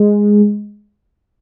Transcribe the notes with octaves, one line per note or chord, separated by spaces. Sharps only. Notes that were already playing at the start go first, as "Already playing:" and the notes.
Already playing: G#3